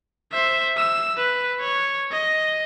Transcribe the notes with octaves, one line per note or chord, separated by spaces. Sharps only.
C5 E5
E6
B4
C#5
D#5